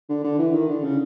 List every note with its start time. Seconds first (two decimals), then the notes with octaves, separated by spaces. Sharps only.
0.09 D3
0.24 D3
0.39 E3
0.54 D#3
0.69 D3
0.84 C#3